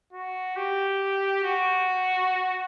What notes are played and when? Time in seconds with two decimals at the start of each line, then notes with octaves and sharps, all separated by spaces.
0.13 F#4
0.56 G4
1.44 F#4